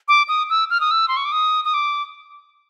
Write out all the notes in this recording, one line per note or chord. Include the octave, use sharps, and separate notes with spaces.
D6
D#6
E6
F6
D#6
E6
C6
C#6
D6
D#6
D#6
D6